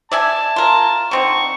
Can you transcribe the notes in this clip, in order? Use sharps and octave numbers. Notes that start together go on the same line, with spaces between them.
D5 E5 G#5 A5
F4 A#4
D3 C4 D#4 C#6